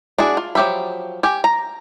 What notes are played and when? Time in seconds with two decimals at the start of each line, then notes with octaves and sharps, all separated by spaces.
0.18 D4 E4 F#4 G#4
0.37 F4
0.55 F3 F#3 G4 E5 B5
1.23 G4 G#5
1.44 A#5